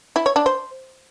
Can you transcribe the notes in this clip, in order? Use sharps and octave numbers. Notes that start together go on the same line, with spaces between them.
E4
C#5
D4
C5